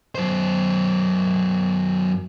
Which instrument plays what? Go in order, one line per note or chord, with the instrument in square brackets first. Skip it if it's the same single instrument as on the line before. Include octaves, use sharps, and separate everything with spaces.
[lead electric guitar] F#2 C5